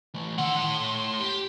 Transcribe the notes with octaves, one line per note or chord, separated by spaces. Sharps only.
E3 A3
D#3 F#5 C6
A3 C#5
G4